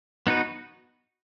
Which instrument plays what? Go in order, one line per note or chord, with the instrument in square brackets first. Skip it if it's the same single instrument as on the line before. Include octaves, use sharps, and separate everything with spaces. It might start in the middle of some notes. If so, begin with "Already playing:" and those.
[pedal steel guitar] B3 D#4 F#4 B4